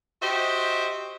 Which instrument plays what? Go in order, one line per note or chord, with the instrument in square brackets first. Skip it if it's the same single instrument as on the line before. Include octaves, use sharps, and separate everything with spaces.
[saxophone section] F#4 G4 C5 D#5 E5